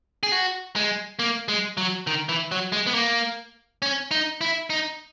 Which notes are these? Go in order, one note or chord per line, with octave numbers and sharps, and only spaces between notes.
G#4
F#4
G#3
A#3
G#3
F#3
D#3
E3
F#3
G#3
B3
A#3
C#4
D#4
E4
D#4